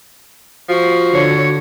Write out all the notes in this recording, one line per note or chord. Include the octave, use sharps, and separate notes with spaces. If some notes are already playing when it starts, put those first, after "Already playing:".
F3 F#4
D3 C#5